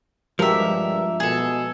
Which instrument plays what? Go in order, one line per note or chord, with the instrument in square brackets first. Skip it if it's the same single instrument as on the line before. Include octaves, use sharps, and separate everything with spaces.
[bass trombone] G2 [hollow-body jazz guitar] F3 [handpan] G#3 F#4 G4 [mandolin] A#4 E5
[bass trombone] B2 [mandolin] G#4 A4